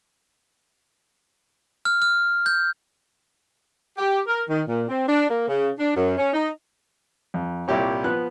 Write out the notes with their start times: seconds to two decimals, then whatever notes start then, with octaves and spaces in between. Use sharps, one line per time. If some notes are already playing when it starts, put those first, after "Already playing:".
1.85 F6
2.02 F6
2.46 G6
3.98 G4
4.27 A#4
4.49 D#3
4.68 A#2
4.88 C4
5.08 D4
5.29 A#3
5.48 C#3
5.79 D4
5.95 F#2
6.18 C#4
6.33 D#4
7.34 F2
7.68 C2 A#2 E4 G4 C#5
8.04 F3 B3 F#6